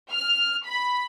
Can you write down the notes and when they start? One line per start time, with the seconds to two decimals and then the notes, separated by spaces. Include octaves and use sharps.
0.12 F6
0.67 B5